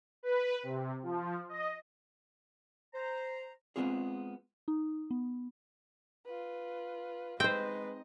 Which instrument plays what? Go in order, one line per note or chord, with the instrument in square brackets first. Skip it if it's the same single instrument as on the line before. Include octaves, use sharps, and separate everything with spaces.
[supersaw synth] B4
C3
F3
D#5
[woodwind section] C5 A#5
[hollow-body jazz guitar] G#3 A3 B3 C4 F4 G#4
[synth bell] D#4
B3
[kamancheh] F4 B4
[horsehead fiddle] G#3 B4 [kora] C4 C5 [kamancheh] D#4 D#5 [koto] G5